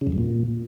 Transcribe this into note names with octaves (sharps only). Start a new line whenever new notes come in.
C#3
F2
F#2
A#2